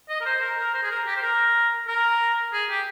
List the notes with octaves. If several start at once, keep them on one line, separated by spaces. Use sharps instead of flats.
D#5
A#4
C5
A#4
A#4
C5
G#4
A#4
G4
C5
A#4
A#4
G#4
G4